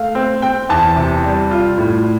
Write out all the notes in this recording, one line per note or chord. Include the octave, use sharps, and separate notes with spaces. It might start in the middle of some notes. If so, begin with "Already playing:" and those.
Already playing: A3 F5
C4
C4 G5
E2 A5
C3
G3
F4
A2